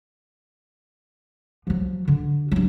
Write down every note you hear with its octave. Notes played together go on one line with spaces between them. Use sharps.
F3 F#3
D3
G2 F#3